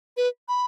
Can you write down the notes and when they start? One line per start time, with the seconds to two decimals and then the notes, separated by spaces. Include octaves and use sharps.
0.17 B4
0.48 B5